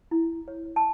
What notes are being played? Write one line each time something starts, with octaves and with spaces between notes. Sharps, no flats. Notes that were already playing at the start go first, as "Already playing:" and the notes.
E4
C#5
A5